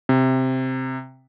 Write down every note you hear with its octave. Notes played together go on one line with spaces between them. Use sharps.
C3